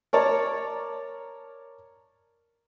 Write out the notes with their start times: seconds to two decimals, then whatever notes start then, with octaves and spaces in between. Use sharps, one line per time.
0.13 A#4 C#5 D5 A5